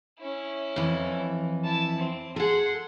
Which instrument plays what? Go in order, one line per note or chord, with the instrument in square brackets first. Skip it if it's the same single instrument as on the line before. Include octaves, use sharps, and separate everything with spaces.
[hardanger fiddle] C#4 E4
[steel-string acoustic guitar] F2 E3
[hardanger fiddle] E4 A5
C4
[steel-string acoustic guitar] G#4 A4 [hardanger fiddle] F#5 C6